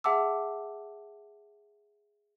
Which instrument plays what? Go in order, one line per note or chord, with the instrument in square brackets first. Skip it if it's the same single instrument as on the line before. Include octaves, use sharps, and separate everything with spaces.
[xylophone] G#4 E5 F#5 A5 D6 E6